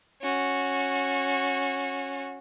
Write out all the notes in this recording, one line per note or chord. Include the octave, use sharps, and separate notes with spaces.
C#4 F#4